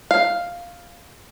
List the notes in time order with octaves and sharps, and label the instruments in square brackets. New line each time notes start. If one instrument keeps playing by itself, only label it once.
[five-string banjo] F5